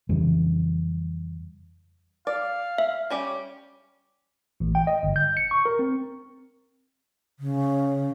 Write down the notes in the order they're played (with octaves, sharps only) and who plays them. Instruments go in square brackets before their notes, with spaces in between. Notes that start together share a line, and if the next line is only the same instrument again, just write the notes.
[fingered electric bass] F2 C#3 E3 G3
[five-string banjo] D5 [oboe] F5
[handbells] E5
[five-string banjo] G3 C#4 G4
[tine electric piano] A1
G5
D#5
G1
G6
C#7
C#6
A#4
C4
[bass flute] C#3